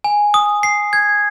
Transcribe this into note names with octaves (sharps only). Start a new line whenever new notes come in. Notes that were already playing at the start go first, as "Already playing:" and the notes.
G#5
D#6
C7
G#6